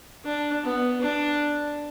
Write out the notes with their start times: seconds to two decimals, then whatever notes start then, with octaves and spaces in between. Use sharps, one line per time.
0.25 D4
0.64 B3
1.02 D4